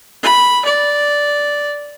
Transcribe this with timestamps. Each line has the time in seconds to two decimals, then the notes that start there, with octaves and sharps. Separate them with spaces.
0.23 B5
0.65 D5